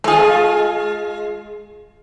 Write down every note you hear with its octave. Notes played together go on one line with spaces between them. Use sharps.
G#3 F4 G#4 A4